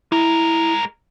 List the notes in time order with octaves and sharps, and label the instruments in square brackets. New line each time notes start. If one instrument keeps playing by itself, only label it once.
[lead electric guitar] G#3 A#4 [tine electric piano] E4